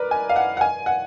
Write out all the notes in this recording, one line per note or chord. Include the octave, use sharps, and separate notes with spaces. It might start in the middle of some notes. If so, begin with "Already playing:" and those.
Already playing: A#4 B4 D5
G#5
F5
F#5
F#5
G#5
F#5